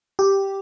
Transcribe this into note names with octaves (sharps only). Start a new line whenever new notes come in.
G4